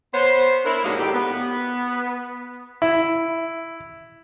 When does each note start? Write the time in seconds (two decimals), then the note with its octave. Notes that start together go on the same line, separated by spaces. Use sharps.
0.13 B3 C5 C#5
0.64 D4 E4 A#4
0.84 G#2 B2 D3 F#3 G#3 A#3
0.97 A2 D#3 G4
1.14 B3
2.82 E4